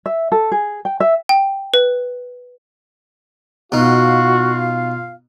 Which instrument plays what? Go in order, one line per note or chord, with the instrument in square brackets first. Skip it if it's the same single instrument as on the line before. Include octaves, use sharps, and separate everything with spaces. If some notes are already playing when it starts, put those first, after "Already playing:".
[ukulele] E5
A4
G#4
G5
E5
[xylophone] G5
B4
[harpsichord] B2 D#4 [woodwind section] F4 F5 [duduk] F#4